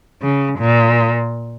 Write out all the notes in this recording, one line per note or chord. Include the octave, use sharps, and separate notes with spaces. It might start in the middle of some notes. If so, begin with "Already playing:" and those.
C#3
A#2